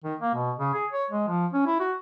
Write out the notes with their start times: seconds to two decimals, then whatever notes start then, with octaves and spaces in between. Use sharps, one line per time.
0.04 D#3
0.20 A#3
0.35 B2
0.59 C#3
0.74 G#4
0.92 C#5
1.10 G#3
1.28 F3
1.53 C#4
1.67 E4
1.80 F#4